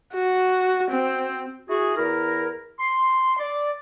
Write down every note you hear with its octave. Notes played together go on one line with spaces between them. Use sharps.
F#4
C4
E4 F#4 G#4
E2 E4 A#4
C6
D5